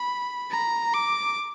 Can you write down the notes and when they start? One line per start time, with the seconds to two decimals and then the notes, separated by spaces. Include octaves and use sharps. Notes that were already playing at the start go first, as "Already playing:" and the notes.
Already playing: B5
0.52 A#5
0.94 D6